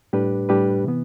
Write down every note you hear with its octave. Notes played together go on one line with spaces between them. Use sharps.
A2 G3 D4 G4 B4
A2 G3 D4 G4 B4
C3 E3 B3